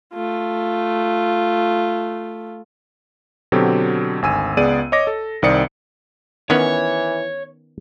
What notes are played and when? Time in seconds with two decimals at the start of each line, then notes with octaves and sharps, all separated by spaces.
0.13 A3 F4
3.52 B2 D3 F#3 C4 G4 A4
4.22 G#1 D2 G#5 E6 D#7
4.57 C#2 B3 G#4 D5 D#7
4.92 C#5 D#5 D6 A#6
5.07 A4
5.43 C2 D#3 C4 D5 D#6 C#7
6.50 D#3 E3 B3 C#4 C#5